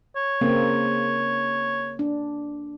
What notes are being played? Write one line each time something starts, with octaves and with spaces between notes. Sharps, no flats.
C#5
C#3 A#3 C4
D4